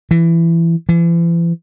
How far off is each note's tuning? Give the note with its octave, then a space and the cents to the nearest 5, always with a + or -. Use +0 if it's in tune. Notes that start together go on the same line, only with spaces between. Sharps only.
E3 +20
E3 +40